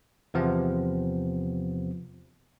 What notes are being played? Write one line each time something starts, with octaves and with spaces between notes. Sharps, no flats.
E2 C3 F3 B3